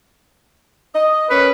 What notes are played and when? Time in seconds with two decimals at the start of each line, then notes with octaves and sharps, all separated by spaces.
0.94 D#5
1.30 C#4 A#4 B4